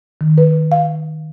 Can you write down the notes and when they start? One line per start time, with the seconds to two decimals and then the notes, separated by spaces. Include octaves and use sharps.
0.21 D#3
0.38 B4
0.72 F5